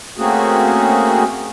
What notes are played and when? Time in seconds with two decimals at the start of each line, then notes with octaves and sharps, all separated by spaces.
0.18 A3 A#3 C4 C#4 F#4 G#4